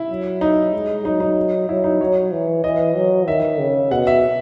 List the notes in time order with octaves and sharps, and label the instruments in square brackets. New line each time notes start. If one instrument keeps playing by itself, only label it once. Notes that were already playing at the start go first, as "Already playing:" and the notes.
Already playing: [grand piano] E4
[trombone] F#3
[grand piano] D#4
[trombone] G#3
[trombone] F#3 [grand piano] D#4
[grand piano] D#4
[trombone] F#3 [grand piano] E4
[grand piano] D#4
[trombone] F#3 [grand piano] C#5
[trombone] E3
[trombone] E3 [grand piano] D#5
[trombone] F#3
[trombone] D#3 [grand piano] E5
[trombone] C#3
[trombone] B2 [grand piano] F#5
[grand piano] E5